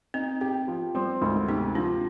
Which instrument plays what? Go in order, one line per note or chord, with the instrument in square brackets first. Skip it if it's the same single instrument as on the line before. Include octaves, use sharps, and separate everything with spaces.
[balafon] C4 [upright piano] D#4
[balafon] C4 [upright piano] G4
[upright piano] F3
[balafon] G3 [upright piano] C4
[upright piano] D2 [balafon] G#3
[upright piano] C3 [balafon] D#4
[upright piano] F3 [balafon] D4